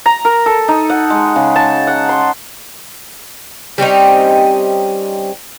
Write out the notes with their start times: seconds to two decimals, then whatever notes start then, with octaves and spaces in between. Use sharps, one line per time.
0.06 A#5
0.25 A#4
0.46 A4
0.68 D#4
0.90 F#5
1.10 G#3
1.36 C#3
1.56 A5
1.87 F#5
2.09 C6
3.78 G3 C4 C#4 D#4